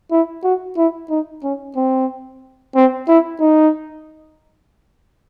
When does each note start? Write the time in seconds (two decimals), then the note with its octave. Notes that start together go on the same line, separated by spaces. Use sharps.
0.11 E4
0.44 F#4
0.77 E4
1.10 D#4
1.43 C#4
1.76 C4
2.75 C4
3.08 E4
3.40 D#4